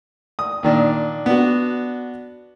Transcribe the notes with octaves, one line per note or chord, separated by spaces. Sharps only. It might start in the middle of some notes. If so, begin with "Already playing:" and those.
D#6
A#2 D#3 D4
B3 D4 F#4